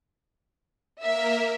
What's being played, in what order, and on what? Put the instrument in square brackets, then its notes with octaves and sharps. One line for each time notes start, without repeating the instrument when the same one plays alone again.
[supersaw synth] A#3 A#4 [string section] E5